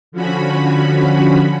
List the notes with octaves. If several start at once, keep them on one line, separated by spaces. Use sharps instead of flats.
D3 F3 C#4 F#4 B5